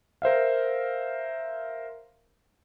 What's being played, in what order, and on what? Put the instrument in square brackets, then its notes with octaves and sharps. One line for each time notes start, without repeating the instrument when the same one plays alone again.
[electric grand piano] A#4 C5 E5 F5